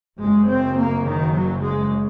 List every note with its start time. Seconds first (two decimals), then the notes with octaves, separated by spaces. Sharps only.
0.19 F#1 F#2 C#3 G#3
0.48 C4
0.77 A#3
1.05 D#3
1.34 F#3
1.62 G#3